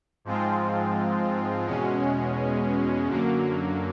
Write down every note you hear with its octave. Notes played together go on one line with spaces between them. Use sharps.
G#2 F3 G#3 C4 F4
E2 B2 G#3 C#4
F#2 D3 F#3 A#3